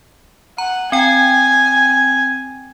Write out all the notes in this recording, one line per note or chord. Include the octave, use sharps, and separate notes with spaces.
F#5 A#5
C4 G5 G#5